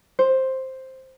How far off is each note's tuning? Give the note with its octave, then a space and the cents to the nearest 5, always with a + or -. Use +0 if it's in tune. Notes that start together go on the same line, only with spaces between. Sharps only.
C5 +5